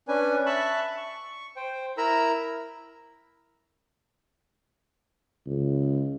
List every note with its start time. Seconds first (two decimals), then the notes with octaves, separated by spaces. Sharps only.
0.08 C#4 D4 B4 G#5
0.46 E5 A5 B5 C#6 F#6
0.97 C#6
1.56 C5 G5
1.98 E4 A#4 A#5 B5 E6
5.47 C#2